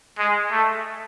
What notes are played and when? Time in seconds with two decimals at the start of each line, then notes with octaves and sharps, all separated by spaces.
0.18 G#3
0.51 A3